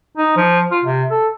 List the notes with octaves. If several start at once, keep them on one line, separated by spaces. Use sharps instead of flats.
D#4
F3
F4
C3
A4